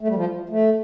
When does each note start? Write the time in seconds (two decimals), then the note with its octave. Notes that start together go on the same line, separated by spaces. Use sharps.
0.01 A3
0.08 G3
0.15 F3
0.49 A3